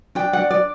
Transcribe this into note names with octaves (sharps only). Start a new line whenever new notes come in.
D4 G5
F#5
D4
D5